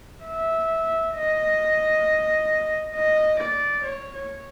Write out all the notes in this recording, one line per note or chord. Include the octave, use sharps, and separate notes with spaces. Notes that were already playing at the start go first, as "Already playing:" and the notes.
E5
D#5
D#5
D5
C#5
C#5